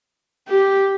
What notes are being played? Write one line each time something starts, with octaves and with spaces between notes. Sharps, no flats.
G4